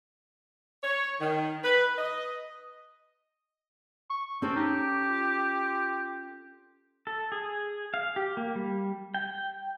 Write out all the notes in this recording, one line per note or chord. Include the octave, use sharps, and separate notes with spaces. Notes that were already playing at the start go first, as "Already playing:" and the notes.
C#5
D#3
B4
D#5
C#6
C4 C#4 A4
D#4 G4
D6
F4
A4
G#4
F5
G4
A#3
G3
G5